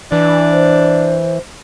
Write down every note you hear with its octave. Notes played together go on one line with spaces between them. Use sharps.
E3 D4
C5